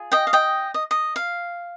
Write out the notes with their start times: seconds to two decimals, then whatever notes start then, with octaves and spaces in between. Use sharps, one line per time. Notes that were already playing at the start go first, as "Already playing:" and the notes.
Already playing: F4 G#4
0.12 D#5 G5
0.27 F5
0.33 D#5 G5
0.74 D#5
0.91 D#5
1.16 F5